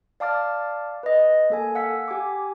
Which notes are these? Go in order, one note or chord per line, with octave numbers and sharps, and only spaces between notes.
D5 F5 A5 D6 F6 A6
B4 D#5
A#3 A4 G#5
F5 F#5 E6 B6
G4 G#5 D6